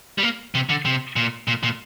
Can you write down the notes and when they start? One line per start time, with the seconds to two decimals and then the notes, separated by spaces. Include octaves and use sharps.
0.18 G3
0.23 A#3
0.55 C3
0.69 D3
0.85 C3
1.16 A#2
1.48 A#2
1.63 A#2